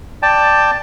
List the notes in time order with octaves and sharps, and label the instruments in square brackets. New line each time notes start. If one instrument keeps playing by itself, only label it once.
[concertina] D5 G5 A5